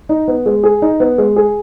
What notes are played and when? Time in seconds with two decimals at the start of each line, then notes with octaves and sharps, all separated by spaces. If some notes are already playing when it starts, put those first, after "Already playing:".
0.09 D#4
0.28 B3
0.46 G#3
0.64 G#4
0.82 D#4
1.00 B3
1.18 G#3
1.36 G#4